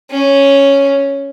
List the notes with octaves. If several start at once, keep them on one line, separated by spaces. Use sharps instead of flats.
C#4